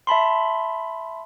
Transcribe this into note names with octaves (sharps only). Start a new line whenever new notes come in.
E5 A5 B5 C6